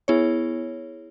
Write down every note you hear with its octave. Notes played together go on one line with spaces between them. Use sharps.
B3 E4 G#4 C#5